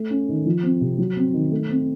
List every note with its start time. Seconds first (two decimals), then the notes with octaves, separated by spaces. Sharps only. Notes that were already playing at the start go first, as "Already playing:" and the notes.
Already playing: A3
0.10 C#4
0.29 D#3
0.46 F3
0.63 C4
0.81 C3
0.98 F#3
1.17 C4
1.34 D#3
1.51 A3
1.69 C4